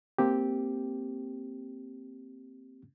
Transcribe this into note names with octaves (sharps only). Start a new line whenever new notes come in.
A#3 C4 G4